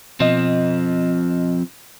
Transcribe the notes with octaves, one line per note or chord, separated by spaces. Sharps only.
B2 F3 C4 D#5